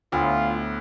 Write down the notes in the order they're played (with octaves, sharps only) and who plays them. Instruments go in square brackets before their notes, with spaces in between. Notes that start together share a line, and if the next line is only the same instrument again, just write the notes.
[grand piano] D2 [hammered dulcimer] A2 B3 [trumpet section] F4